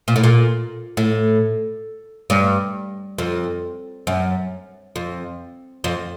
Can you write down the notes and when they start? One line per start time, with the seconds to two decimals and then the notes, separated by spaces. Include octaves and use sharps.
0.08 A#2
0.16 A2
0.23 A#2
0.97 A2
2.30 G2
3.18 F2
4.07 F#2
4.96 F2
5.84 F2